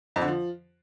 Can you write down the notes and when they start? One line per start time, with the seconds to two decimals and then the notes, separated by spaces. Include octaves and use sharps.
0.16 F2
0.22 D3
0.27 F3